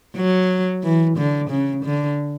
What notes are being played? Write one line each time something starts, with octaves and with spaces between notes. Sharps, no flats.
F#3
E3
D3
C#3
D3